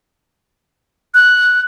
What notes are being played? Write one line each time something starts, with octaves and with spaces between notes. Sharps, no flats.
F#6